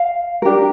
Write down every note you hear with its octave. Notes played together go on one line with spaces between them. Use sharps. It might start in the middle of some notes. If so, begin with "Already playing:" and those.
Already playing: F5
D4 G4 A#4